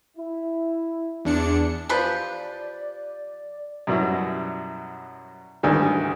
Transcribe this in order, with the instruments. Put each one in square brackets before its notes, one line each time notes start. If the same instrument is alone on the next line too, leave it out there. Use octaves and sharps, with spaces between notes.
[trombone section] E4
[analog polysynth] E2 D4 C#7
[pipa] F3 G4 B4 [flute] D5
[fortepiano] F#2 B2 F#3 G3 E4
D2 G#2 D#3 E3 G3